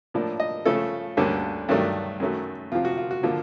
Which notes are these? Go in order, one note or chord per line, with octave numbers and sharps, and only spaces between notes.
A2 F3 A#3 D4
D#5
C#3 F3 A3 A4
D2 D3 G3 A#3 C#4
G2 D#3 F#3 A3 D4
F#2 D#3 F#3 A3
F2 C3 F3 F4
F#4
F4
F#4
D3 F3 A#3 F4